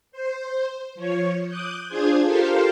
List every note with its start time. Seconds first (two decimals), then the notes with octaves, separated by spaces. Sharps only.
0.12 C5
0.95 F3 C#5
1.47 D6 D#6 F#6 G6
1.87 D4 F4 G#4 C5 G#6
2.24 F4 G4 A4 A#4 C5 F5